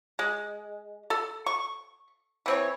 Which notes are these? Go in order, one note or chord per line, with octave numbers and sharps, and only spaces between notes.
G#3
A4
C#6
E3 C4 C#5